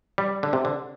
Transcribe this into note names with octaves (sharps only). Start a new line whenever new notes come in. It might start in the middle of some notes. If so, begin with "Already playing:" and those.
G3
D3
C3
D3